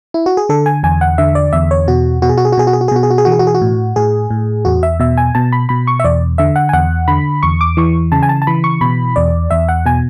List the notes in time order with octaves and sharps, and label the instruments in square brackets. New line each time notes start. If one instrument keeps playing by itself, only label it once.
[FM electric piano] E4
F#4
G#4
D3 A4
G#5
E2 G#5
F#5
D3 E5
D5
E2 E5
C#5
B2 F#4
B2 F#4
G#4
F#4
G#4
F#4
B2 G#4
F#4
G#4
F#4
G#4
B2 F#4
G#4
F#4
G#4
E3 F#4
G#4
F#4
G#4
F#4
A2
A2 G#4
A2
E2 F#4
E5
B2 E5
G#5
B2 A5
B5
B2 B5
C#6
E5
E2 D5
D3 E5
F#5
G#5
E2 F#5
D3 B5
E2 C#6
D6
E3 C#6
C#3 A5
G#5
A5
A5
E3 B5
C#6
B2 B5
E2 D5
E2 E5
F#5
B2 G#5